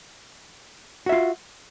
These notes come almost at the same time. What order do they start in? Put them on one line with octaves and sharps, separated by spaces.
F#4 E5 F4